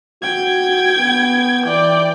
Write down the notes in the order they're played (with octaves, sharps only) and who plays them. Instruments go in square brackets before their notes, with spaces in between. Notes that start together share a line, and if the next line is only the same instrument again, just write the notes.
[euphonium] F#4 [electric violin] G5 G#6
[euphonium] B3
[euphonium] E3 [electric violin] D5 G5